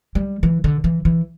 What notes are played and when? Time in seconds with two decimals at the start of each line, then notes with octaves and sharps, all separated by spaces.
0.15 G3
0.43 E3
0.64 D3
0.84 E3
1.05 E3